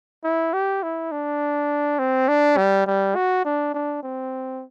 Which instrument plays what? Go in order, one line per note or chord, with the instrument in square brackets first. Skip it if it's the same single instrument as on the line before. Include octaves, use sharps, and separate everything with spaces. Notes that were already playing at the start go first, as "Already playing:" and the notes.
[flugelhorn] E4
G4
E4
D4
C4
D4
G3
G3
F#4
D4
D4
C4